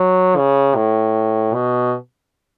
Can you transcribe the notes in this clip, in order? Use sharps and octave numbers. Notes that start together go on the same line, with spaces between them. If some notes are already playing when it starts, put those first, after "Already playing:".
Already playing: F#3
C#3
A2
B2